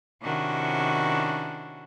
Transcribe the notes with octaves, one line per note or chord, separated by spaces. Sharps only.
C3 D#3 C#4 D4 E4 F#4